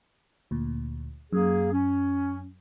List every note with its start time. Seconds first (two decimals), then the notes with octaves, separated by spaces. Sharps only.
0.51 D2 A#2
1.33 F#2 A#3 G#4
1.72 C#4